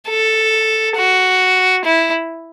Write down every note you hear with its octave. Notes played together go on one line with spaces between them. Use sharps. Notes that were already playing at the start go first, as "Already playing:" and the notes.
A4
F#4
E4